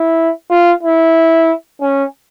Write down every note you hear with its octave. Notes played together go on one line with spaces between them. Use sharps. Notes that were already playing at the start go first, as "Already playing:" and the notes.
Already playing: E4
F4
E4
C#4